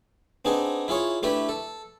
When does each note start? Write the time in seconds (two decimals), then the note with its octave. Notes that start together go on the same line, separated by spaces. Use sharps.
0.45 B3 C4 D4 D#4 G#4
0.88 E4 F4 G#4 C#5
1.23 A3 D4 E4 G4 B4
1.49 A4